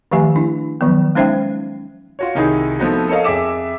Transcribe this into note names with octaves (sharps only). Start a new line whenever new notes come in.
D#3 F3 A3 G4 E5 G#5
D4 E4
D#3 F3 F#3 B3
G#3 C#4 D#4 C5 E5 G5
F4 F#4 C#5
C2 D#3 D#4 E4 G#4 D#6
F3 A3 B3 C4 D#4 F#4
A4 A#4 C#5 D#5 F5
F2 G#4 E5 D6 E7